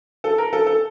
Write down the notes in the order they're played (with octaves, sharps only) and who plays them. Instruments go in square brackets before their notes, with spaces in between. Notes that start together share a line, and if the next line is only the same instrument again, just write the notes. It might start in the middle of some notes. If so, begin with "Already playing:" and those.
[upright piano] A4
A#4
A4
A4